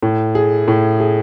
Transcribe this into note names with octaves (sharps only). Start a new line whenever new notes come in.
A2
G#4
A2
G#4